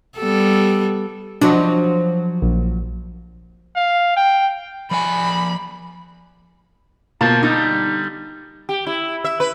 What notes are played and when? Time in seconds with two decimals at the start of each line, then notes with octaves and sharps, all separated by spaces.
0.18 G3 B3 A4
1.41 F3 F#3 D4 F#4 D#5
2.42 A#1
3.76 F5
4.17 G5
4.91 F3 D5 G#5 B5
7.21 B2 A#3 F4 C5 A5
7.43 D3 G3 D#4
8.69 G4
8.86 E4
9.25 E5
9.40 B4